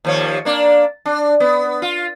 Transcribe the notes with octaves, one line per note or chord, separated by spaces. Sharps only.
D#2 F3 C#5
A#3 D4
D4
B3
F4